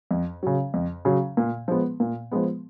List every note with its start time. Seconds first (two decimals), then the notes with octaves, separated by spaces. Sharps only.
0.11 F2
0.43 C#3 F#3
0.74 F2
1.05 C#3 F#3
1.37 A#2
1.68 F3 G#3 B3
2.00 A#2
2.31 F3 G#3 B3